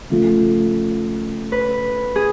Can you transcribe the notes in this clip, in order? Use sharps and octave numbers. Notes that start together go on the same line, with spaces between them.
C#3 F3 A3 F4
B4
G#4